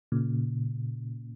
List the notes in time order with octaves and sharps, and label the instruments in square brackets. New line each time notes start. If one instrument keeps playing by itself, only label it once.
[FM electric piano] A#2 C#3